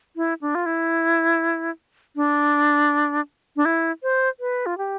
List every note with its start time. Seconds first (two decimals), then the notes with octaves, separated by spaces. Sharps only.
0.16 E4
0.41 D4
0.55 F4
0.66 E4
2.16 D4
3.56 D4
3.65 E4
4.03 C5
4.40 B4
4.66 F4
4.78 G4